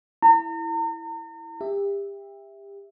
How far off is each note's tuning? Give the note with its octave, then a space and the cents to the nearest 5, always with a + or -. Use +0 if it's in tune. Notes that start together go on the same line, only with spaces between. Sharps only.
E4 +0 A#5 -40
G4 +30 E5 +0